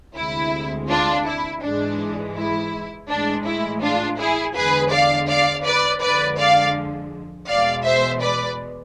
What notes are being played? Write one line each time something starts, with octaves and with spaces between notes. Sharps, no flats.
D2 C3 G#3 E4
D4 F4
E4
G#2 E3 G#3 D4
E4
A2 E3 G#3 D4
E4
D4 F4
E4 G#4
E2 D3 G#3 G#4 B4
D5 F5
D5 F5
B4 D5
F2 D3 F3 G#3 B4 D5
D5 F5
E2 B2 G#3 D5 F5
C5 E5
B4 D5